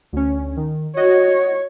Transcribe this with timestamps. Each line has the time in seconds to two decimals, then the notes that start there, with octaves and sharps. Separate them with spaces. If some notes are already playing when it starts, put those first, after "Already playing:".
0.13 D2 C#4
0.57 D#3
0.97 F#4 C#5 D#5